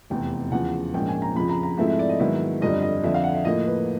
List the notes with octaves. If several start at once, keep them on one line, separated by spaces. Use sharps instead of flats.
F1 E2 C3 G5
E2 C#3 F3 F#5
A#1 G#2 F3 A#3 C#4 G5
G#5
A#5
F2 C#3 F3 B5
A#5
A#5
G#2 F3 A3 C4 E4 E5
E5
D5
D#5
G#2 D#3 F#3 B3 E4 E5
G1 F2 D3 G3 D#5
D#5
F2 D3 F3 E5
F5
F#5
E5
A2 F3 A#3 D#5
B4